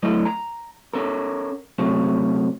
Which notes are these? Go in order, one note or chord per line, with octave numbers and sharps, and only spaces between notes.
F#3 A3 E4 A4 D#5
A#5
C#4 A4 A#4
C3 F#3 A3 C#4